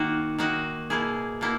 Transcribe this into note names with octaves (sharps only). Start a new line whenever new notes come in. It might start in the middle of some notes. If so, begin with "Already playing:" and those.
Already playing: D#3 A#3 D#4 F#4
D#3 A#3 D#4 F#4
B2 A#3 E4 G#4
B2 A#3 E4